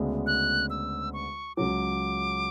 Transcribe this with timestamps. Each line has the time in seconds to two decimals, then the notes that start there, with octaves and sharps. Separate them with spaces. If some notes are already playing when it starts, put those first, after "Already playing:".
Already playing: D2 C#3 G#3 B3 D4
0.27 F#6
0.70 E6
1.14 C#6
1.57 C#2 C#3 F#3 D6